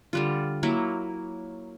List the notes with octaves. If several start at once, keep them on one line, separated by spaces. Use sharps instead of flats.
D3 G3 F4
F#3 A#3 E4